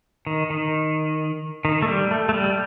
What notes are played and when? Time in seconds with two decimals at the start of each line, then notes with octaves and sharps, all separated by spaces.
0.27 D#3
0.50 D#3
1.65 D#3
1.82 A3
1.88 G3
2.11 A3
2.29 A3
2.34 G3